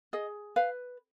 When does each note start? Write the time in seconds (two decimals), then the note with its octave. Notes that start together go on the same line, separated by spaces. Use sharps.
0.13 G#4 D#5
0.56 B4 F5